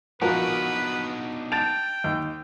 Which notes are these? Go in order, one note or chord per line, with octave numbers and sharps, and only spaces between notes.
A#1 F3 B3 D4 D#4 F#4 A#4 B4
G5 A5 A6 D7 F7
D#2